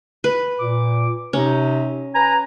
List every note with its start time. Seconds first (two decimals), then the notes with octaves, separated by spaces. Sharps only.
0.24 B4
0.59 A#2 D6
1.33 C3 C#4 D#4
2.13 B4 G#5 A#5